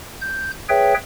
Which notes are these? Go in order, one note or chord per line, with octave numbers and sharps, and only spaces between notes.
G6
G#4 B4 C#5 E5 G5